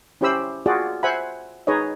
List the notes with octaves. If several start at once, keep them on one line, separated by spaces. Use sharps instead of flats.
C#4 E4 G4 C5 B5 E6
F4 F#4 G#4 D5
C5 E5 F#5 G#5 B5
D#4 G#4 B4 C#5 D#5